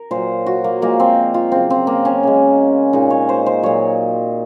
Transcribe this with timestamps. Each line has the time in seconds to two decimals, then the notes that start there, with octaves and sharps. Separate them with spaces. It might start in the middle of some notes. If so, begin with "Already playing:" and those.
Already playing: A#4
0.11 A#2 F#3 C5
0.47 F#4
0.64 A#3
0.82 A#2 F3 G#3 A#3
1.00 C4
1.34 F4
1.52 C#3 F#3 C4
1.70 C4
1.87 A#3
2.05 C#4
2.23 C#3 G#3
2.93 A#2 G#3 D#4
3.10 C#5
3.29 C5
3.46 C5
3.63 A#2 F#3 C#5